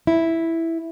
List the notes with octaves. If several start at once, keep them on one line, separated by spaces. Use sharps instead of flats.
E4